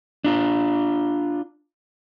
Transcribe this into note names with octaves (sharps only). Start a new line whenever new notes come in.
D4 F4